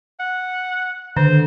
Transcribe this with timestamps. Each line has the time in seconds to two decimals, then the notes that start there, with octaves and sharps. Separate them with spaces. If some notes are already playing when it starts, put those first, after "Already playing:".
0.19 F#5
1.17 D3 D#3 C5